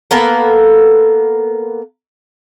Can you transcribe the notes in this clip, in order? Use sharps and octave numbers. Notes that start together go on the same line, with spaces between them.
A#3 B3 A4 A#4